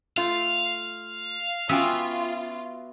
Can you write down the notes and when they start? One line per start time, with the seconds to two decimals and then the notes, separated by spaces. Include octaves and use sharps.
0.17 A3 F4 F5
1.69 B3 C#4 F4 F#4 E5 G5